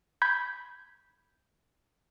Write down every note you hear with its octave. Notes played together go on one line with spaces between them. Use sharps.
B5 G6 G#6